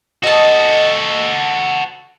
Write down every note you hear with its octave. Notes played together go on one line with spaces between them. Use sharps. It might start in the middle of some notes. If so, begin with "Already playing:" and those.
F#4 A4 D#5 A5